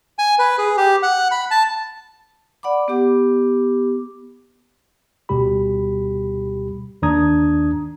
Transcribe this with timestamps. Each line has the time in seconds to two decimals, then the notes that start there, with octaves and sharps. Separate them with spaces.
0.19 G#5
0.39 B4
0.58 G#4
0.77 G4
1.03 F#5
1.32 B5
1.51 A5
2.63 D5 F#5 B5 D6
2.88 B3 G4 D6
5.29 D2 B2 G3 G4 B5
7.02 D#2 D#3 D4 A#5 D#6 G#6